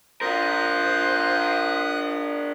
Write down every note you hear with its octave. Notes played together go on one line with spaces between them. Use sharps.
D4 F4 A#4 C5 F5 D#6 F#6